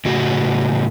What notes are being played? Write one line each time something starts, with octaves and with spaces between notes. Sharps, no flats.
A2 C#3 F#4